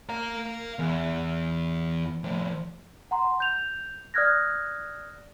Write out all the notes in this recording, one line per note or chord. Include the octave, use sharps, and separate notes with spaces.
F5 A#5
E2
A2 F3
F#5 A#5 C6
G6 F7
D5 D#6 F6 F#6 G#6 A#6